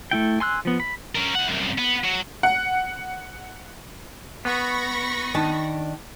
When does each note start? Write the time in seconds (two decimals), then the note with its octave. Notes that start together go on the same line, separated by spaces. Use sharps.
0.11 A3 E4 G5
0.40 G#5 C6 E6 F#6
0.65 F3 B3
0.80 B5
1.15 C#4 A#4
1.35 E4 F#5
1.49 C2 F#2
1.78 B3
2.04 F#3
2.43 F#5
4.45 B3 B5 C#6 A#6
5.34 D#3 D4 A5